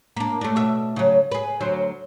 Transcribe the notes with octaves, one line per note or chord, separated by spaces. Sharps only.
A#3 D4
A3 D4
B2 E5
C#3 F#3
G#4 B4
D2 F#3 C5